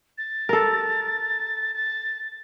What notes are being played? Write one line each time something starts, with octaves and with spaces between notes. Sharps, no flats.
A6
A4 A#4
A6